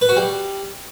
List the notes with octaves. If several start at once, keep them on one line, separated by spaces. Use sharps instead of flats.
B4
F#4
G3